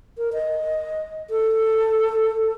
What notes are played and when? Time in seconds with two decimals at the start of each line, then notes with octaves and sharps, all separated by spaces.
0.18 A#4
0.33 D#5
1.30 A4